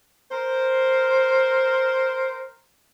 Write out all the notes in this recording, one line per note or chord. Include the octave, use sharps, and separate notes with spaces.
A#4 C5